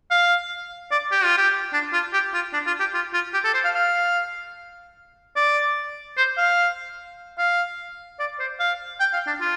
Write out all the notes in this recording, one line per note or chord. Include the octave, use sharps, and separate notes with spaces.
F5
D5
G4
F4
G4
D4
F4
G4
F4
D4
F4
G4
F4
F4
G4
A4
C5
F5
F5
D5
C5
F5
F5
D5
C5
F5
G5
F5
D4
F4